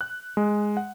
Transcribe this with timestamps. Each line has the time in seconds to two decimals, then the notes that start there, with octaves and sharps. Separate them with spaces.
0.01 F#6
0.37 G#3
0.77 F#5